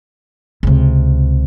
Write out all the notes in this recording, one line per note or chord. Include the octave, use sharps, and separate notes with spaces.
C#2 C3